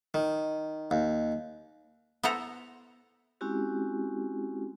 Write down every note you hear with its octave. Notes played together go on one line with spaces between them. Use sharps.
D#3
D#2
B3 E4 A4 C5 F#5 A#5
G#3 C4 C#4 E4 F#4 G4